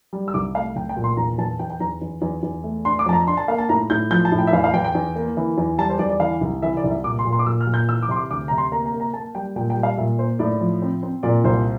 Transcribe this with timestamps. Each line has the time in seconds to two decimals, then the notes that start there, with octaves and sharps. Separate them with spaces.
0.13 G3
0.28 E6
0.34 C2 D6
0.55 A3 F5
0.76 C2 G5
0.89 G5
0.97 A#2
1.04 C6
1.17 E2 A#5
1.38 E2 A5
1.59 E2 G5
1.70 G5
1.80 E2 A#5
2.02 E2
2.22 E2
2.43 E2
2.64 A3
2.85 D4 C6
2.99 D6
3.06 F2 A5
3.13 A#5
3.27 D4 C6
3.37 A5
3.48 A#3 F5
3.58 A5
3.69 A2 A#5
3.90 A2 G6
4.11 F3 G6
4.25 A5
4.32 A2
4.39 G5
4.47 E5
4.53 E2 F5
4.64 F5
4.74 E2 G5
4.84 G5
4.95 E2
5.16 A#3
5.37 E3
5.58 E2
5.78 G3 A5
5.90 C5
5.99 E2 D5
6.10 D5
6.20 E3 F5
6.41 C2
6.62 E3 E5
6.77 D5
6.84 C2
6.91 E5
7.04 A#2 D6
7.19 C6
7.25 A#2
7.33 C6
7.39 D6
7.46 A#2 E6
7.61 F6
7.67 A#2
7.74 G6
7.88 E3 E6
8.02 D6
8.09 C3 C6
8.16 D6
8.30 D2 D6
8.48 C3 A#5
8.58 C6
8.72 A#3 A#5
8.86 A#5
8.93 A#3
9.00 A#5
9.14 A#3 A5
9.35 G3 G5
9.56 A#2 G5
9.70 G5
9.76 G3
9.83 F5
9.98 A#2 E5
10.18 A#3 C5
10.39 A2 D5
10.61 F3
10.82 C4
11.03 C4
11.23 A#2 D5
11.44 C2 C5